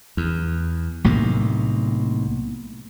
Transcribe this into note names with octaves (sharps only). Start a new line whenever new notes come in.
E2
B1 A2 C3 A#3